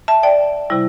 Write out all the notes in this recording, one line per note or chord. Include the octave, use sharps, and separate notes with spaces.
E5 A5
D5 G5
C3 G3 E4